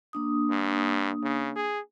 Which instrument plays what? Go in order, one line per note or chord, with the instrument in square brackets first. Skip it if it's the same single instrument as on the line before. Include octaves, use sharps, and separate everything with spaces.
[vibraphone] A#3 D4 D#6
[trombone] G2
C#3
G#4